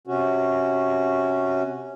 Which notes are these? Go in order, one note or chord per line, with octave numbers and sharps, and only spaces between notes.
C3 C#4 F#4